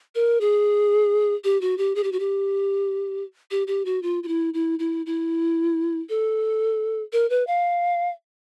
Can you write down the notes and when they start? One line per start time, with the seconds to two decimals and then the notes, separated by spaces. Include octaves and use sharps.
0.15 A#4
0.41 G#4
1.44 G4
1.61 F#4
1.78 G4
1.95 G#4
2.04 G4
2.12 F#4
2.20 G4
3.51 G4
3.67 G4
3.85 F#4
4.03 F4
4.23 F4
4.28 E4
4.54 E4
4.79 E4
5.06 E4
6.09 A4
7.13 A#4
7.30 B4
7.47 F5